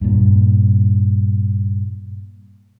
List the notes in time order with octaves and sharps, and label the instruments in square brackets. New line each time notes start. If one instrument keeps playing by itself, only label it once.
[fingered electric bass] G2 A#2